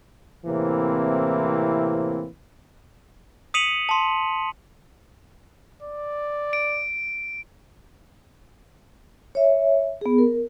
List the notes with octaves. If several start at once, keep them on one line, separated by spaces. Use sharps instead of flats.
A2 C3 E3 A#3 C4 E4
D#6 B6 C#7 D#7 F7 F#7
A5 C6
D5
D7
C#5 E5
B3 G#4
A#4